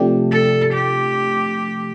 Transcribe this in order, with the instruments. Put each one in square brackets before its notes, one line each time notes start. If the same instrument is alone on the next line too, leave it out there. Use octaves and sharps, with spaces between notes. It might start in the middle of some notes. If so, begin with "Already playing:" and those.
Already playing: [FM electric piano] C3 F3 A3 D4 G4
[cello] A4
G4